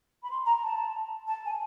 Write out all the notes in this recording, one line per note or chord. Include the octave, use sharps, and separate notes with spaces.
B5
C6
A#5
A5
A5
G#5